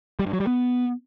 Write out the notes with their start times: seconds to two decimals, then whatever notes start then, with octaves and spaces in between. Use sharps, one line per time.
0.19 G3
0.26 G2
0.33 F#3
0.40 G3
0.47 B3